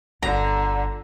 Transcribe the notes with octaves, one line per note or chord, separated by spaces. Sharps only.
G1 D3 F4 A#5